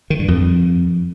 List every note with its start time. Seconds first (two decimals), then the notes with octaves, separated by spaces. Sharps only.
0.10 D#3
0.19 G2
0.28 F2